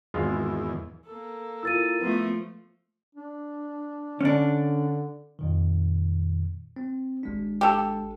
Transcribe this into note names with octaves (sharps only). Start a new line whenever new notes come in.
G#1 E2 G#3 F4
A#3 A4
E4 F4 A#4 E6 A6 D#7
F3 A3 B3
D4
D3 C#4 D4
F2 A#2 D#3
C4
G#1 G#3 D4
G4 A4